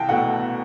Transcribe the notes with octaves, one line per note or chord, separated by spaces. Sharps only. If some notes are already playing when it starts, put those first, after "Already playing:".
Already playing: C2 G5 A5
B2 A3 F#5